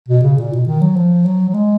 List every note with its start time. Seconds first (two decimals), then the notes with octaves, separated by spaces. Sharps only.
0.09 B2
0.23 C#3
0.38 A#2
0.53 B2
0.67 D#3
0.82 F#3
0.96 F3
1.26 F#3
1.49 F#3
1.54 G#3